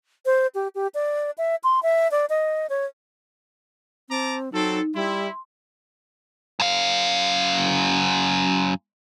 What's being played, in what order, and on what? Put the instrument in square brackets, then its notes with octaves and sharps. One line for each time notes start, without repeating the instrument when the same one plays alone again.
[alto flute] C5
G4
G4
D5
E5
C6
E5
D5
D#5
C#5
[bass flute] C4 [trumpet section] A5 A#5 D6
[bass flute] F#3 [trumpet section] C4 A4 [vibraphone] D#4
[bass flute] G3 [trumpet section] E4 [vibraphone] C6
[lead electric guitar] F#2 F5